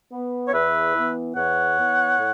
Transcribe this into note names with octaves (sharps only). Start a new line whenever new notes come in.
B3
C#5
E2 B4 E5
E3 B3
E2 C#5 F#5
E3 B3
A2